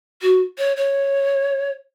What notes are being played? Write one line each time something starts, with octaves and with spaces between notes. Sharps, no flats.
F#4
C#5
C#5